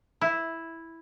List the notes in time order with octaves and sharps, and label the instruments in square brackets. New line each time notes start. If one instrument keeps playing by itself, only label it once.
[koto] E4